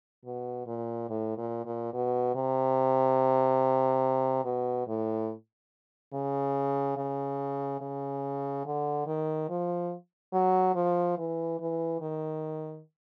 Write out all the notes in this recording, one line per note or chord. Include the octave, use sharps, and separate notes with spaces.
B2
A#2
A2
A#2
A#2
B2
C3
B2
A2
C#3
C#3
C#3
D3
D#3
F3
F#3
F3
E3
E3
D#3